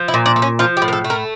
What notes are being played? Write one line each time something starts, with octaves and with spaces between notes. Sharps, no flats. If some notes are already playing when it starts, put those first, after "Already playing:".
Already playing: F3
E4
A#2
D4
A3
C#4
F3 F4
G4
A2
A#4
A4
A3
A#4